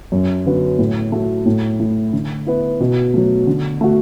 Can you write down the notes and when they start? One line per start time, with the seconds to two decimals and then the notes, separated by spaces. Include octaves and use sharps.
0.12 F#2
0.46 D3 B3 F#4
0.78 A2
1.12 A3 F#4
1.46 A2
1.79 A3 E4
2.13 D3
2.47 B3 E4
2.80 B2
3.14 F#3 A3
3.47 D3
3.81 A3 F#4